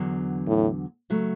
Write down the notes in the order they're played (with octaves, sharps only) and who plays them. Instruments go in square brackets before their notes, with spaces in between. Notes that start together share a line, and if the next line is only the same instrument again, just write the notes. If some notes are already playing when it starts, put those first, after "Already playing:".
Already playing: [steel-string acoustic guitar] E2 D3 F#3
[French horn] A2
[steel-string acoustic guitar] C#3 F#3 A3